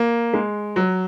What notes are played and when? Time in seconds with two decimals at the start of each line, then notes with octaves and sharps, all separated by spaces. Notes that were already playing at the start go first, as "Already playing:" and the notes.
Already playing: A#3
0.33 G#3
0.76 F#3